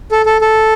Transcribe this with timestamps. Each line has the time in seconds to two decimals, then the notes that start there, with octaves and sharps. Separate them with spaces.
0.11 A4
0.26 A4
0.41 A4